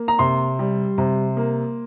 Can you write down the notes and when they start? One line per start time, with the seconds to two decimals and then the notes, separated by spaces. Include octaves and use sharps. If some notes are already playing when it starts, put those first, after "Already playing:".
Already playing: A#3
0.08 A#5
0.19 C3 C6
0.59 G3
0.98 C3
1.37 A#3